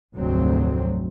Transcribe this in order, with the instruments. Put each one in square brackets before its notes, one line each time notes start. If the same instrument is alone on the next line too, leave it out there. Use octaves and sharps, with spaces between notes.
[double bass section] F1 D2 G#2 F#3 C4